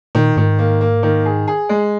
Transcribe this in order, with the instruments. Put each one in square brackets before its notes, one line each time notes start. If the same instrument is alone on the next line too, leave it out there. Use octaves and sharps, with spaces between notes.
[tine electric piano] A#2 [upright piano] D#3
[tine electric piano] G#2 [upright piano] D#3
[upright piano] A#3
A#3
D#3
G#4
G#4
G#3